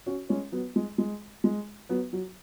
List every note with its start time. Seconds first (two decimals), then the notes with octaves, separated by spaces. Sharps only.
0.06 C#4 F#4
0.29 G#3 C#4
0.52 F#3 B3
0.76 G#3
0.98 G#3
1.44 G#3
1.89 F#3 B3
2.13 F#3